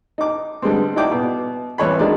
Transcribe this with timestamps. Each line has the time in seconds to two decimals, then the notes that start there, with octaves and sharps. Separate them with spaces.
0.18 D#4 D6
0.62 D3 G3 G#3 B3 C4
0.96 D#4 E4 F#4 D5 G5 D6
1.11 B2 B3
1.78 C2 E3 C#5 B5
1.99 D#3 F#3 G#3 D4 D5